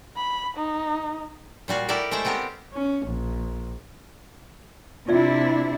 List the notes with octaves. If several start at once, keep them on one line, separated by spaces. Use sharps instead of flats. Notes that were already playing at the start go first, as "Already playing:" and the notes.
B5
D#4
A#2 G3 F#4 F5
E4 G4 A4 A#4 D5 E5
G#3 A3 A4 C5 G5
B3 C4 G4 A#4
C#4
A#1
C3 D4 E4 F4 D5 E5